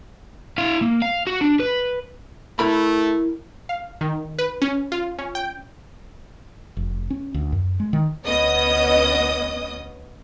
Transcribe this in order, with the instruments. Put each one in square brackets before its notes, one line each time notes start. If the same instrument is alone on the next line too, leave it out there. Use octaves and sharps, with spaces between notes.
[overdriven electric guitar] E4 F5
A#3
F5
F#4
D4
B4
[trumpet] A3 [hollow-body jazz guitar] E4 A#4 B5
[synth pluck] F5
D#3
B4
C#4
F4
C#4
G5
[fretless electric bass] F1
C#4
D2
F#2
G#3
D#3
[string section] D2 B3 C#4 D#5 D#6